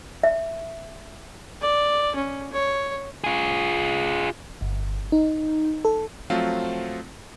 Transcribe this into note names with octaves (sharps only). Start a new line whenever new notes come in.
E5
D5
C#4
C#5
F4 G#4
G1
D#4
A4
F3 F#3 A3 C4 F4